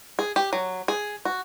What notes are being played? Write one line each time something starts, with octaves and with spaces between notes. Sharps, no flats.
G#4
G4
F#3
G#4
F#4